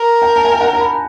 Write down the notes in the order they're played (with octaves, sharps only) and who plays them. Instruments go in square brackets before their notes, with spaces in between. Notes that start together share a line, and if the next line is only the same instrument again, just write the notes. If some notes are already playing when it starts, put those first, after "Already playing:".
Already playing: [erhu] A#4
[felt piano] G5
A5
G#5
G5
F#5
A#5
B5